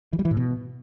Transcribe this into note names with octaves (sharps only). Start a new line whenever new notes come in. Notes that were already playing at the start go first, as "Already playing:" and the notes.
E3
G3
E3
A2
B2